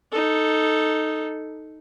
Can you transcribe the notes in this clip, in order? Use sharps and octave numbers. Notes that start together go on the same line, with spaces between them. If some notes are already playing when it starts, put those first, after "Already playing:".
D#4 A4